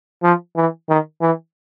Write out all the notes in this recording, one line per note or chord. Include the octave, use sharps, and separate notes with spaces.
F3
E3
D#3
E3